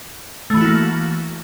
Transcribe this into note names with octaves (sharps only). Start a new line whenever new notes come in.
E3 A3 A#3 E4 F#4